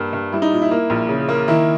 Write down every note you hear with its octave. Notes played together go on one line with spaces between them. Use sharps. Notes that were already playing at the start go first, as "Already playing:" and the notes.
Already playing: G2 A#3
G2
G3 E4
D#4
A#2
E4
A#3
A#1
C#3
A#3
D#3 E4